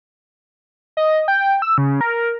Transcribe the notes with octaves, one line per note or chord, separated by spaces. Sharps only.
D#5
G5
E6
C#3
A#4